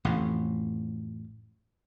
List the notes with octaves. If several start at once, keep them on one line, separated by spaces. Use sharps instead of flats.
A1 F2 A2